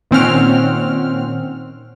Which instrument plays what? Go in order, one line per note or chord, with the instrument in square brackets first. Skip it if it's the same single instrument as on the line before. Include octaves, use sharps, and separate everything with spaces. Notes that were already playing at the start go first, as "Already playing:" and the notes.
[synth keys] A#2 D#3 C4 C#4 F#5 F6